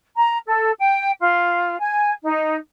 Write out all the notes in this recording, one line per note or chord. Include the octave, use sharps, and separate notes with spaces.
A#5
A4
G5
F4
G#5
D#4